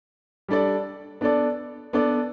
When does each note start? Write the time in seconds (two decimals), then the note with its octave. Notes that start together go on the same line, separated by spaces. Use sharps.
0.48 G3 D4 A4 D5
1.21 B3 D4 A4 D5
1.93 B3 D4 A4 D5